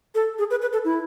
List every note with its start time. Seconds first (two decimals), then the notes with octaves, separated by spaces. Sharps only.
0.15 A4
0.39 G#4
0.51 B4
0.61 B4
0.73 A4
0.85 E4